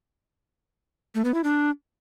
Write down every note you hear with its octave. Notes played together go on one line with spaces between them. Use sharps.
A3
B3
E4
D4